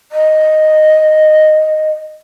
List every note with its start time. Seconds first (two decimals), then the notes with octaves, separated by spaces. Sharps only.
0.12 D#5